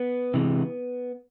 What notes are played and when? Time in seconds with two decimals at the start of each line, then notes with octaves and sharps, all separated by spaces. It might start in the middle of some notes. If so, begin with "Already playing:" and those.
Already playing: B3
0.34 C3 E3 G#3